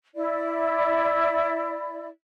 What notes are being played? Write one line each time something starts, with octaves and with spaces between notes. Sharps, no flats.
E4 D5